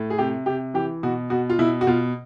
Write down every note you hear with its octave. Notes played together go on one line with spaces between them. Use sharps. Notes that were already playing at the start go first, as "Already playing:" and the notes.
Already playing: A2
G#4
C3 G4
C3 G4
E3 G4
B2 F#4
B2 F#4
F4
B2 E4
F#4
B2 F4